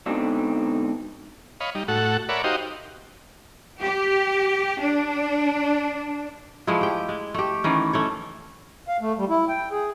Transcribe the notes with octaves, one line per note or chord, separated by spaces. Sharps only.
G#2 B2 D3 C4 D4 D#4
C#5 D#5 F5 B5
G3 D#4
A2 F#4 A4 F#5
A#4 C#5 D5 E5 F#5 B5
D#4 F#4 G4 C5 D#5 F5
G4
D4
F3 G#3 A3 E4
G4 G5
G#3
A3 G4
D#3 E3 C#4
A3 C#4 C#5
F5
A3
G3
E4
G5
G#4